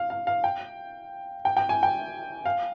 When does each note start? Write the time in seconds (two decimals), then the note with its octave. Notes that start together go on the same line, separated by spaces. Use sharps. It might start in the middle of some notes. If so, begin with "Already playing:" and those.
Already playing: F5
0.10 F5
0.27 F5
0.44 G5
1.45 G5
1.57 G5
1.69 G#5
1.83 G5
2.46 F5